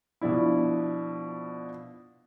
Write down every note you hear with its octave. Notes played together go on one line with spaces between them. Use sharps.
B2 F3 D4 E4